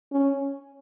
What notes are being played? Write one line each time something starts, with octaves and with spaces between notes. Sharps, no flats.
C#4